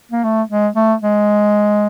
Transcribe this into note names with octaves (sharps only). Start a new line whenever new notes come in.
A#3
A3
G#3
A3
G#3